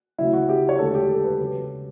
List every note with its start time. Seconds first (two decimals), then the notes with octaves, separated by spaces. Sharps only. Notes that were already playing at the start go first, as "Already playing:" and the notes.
0.18 D2 C#3 F#3 E4
0.33 F#4
0.49 G4
0.69 C#5
0.79 E1 D2 D3 A4
0.95 G4
1.09 A4
1.24 B4
1.40 C#3 F#3